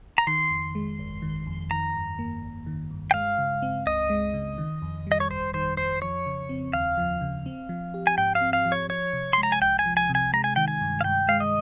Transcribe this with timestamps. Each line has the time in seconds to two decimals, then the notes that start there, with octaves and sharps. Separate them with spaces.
0.18 A#5
0.27 D#3 C6
0.51 F2
0.75 G#3
0.99 G1
1.22 D#3
1.47 F2
1.71 D#3 A#5
1.94 G2
2.19 A#3
2.42 G1
2.66 D#3
2.91 G2
3.11 G5
3.14 G#3 F5
3.38 C#3
3.62 C4
3.86 C#2 D#5
4.10 G#3
4.34 C#3
4.58 D#3
4.82 F2
5.07 G3 D#5
5.20 C#5
5.30 G1 C5
5.54 D#3 C5
5.77 F2 C5
6.02 F3 C#5
6.26 C#3
6.49 C4
6.73 D#2 F5
6.98 F3
7.21 C#3
7.46 C4
7.69 F3
7.94 G4
8.07 G#5
8.18 G#2 G5
8.35 F5
8.41 C4
8.53 F5
8.66 F3
8.72 C#5
8.89 F3 C#5
9.13 C3
9.33 G#3 C6
9.43 A#5
9.52 G#5
9.61 C2 G5
9.79 G#5
9.86 F3
9.97 G#5
10.09 C3
10.15 G#5
10.33 G#3 A#5
10.44 G#5
10.56 D#3 G5
10.68 G#5
10.81 G2
11.01 F5
11.04 G2 G5
11.28 G#3 F5
11.40 D#5